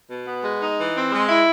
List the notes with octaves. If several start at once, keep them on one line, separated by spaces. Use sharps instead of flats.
B2
B3
G#3
D#4
E3
C4
G#3
E4